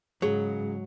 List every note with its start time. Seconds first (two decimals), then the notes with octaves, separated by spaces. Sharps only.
0.22 G#2 C#3 F#3 G#4